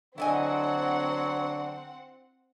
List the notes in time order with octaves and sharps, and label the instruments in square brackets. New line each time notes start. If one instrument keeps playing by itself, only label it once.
[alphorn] D3 [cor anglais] F#3 [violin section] C4 F#5 [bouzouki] E4 D#5 G#5